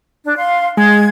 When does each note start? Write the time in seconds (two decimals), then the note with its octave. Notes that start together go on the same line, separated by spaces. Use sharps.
0.24 D4
0.38 F5 C6
0.77 G#3 G#6